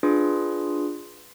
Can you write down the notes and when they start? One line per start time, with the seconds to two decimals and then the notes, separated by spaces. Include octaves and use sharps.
0.03 D4 F4 G#4 B4